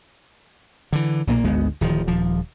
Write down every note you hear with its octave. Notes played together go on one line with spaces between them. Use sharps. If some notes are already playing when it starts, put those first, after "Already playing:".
D3 E3
B1 A#2 F#3 A#3
G#1 D2 G#3 B3
D1 D#3 F3
D#1 F3